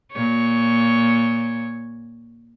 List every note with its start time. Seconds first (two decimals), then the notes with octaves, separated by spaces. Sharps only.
0.13 A#2 C#5